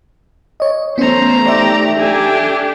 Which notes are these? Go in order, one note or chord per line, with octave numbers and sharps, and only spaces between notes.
C#5 D#5
A3 B3 C#4 C5 A#5
D#4 G4 D5 E5
D4 G4 A4 G#5